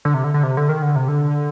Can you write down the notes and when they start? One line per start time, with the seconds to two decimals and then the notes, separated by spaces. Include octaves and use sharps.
0.05 D3
0.14 C3
0.24 D3
0.34 D3
0.43 C3
0.57 D3
0.69 D#3
0.82 D3
0.96 C3
1.08 D3